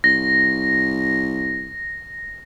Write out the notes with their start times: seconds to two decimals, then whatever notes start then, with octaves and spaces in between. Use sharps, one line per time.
0.04 C2 A#6